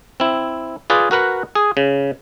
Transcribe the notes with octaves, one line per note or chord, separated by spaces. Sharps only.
C4 E4
F4 G#4 B4 D5
F#4 A#4 B4 F#5
G#4
C#3